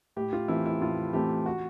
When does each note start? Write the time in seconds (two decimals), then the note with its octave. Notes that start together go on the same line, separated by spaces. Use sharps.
0.16 A2 G4
0.33 F4
0.48 E3 A3 C4 E4
0.66 E4
0.82 A2 F4
1.13 E3 A3 C4 G4
1.46 F#4